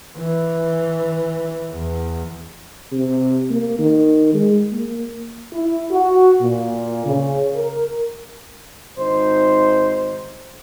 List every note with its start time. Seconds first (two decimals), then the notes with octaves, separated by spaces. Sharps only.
0.17 E3
1.71 E2
2.92 C3
3.50 A#3
3.79 D#3
4.34 G#3
4.72 A#3
5.53 E4
5.91 F#4
6.41 A#2
7.05 C#3
7.55 A#4
8.98 G#1 D#4 C5